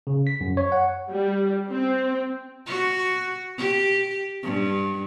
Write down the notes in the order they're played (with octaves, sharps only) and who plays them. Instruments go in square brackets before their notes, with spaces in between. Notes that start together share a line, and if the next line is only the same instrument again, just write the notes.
[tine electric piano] C#3
B6
F#2
C#5
F#5
[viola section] G3
C4
[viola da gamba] F#4
G4
G2